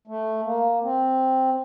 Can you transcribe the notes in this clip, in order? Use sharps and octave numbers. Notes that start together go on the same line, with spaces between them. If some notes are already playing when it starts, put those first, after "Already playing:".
A3
A#3
C4